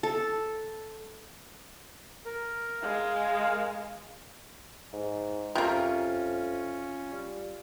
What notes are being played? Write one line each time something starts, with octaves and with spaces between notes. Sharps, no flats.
A4
A#4
G#3 F5
G#2
F2 C3 A#3 C#4 F4
G3